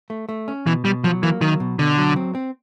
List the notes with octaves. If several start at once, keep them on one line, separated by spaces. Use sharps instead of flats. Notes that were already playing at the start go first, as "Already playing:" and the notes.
A3
A3
C#4
B2 E3
B2 G3
F3 F#3
E3 A#3
D#3 F#3
B2
B2 D3
F#3
C4
C4